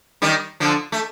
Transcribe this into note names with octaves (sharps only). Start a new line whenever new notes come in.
D#3 G3
D3 F3
A3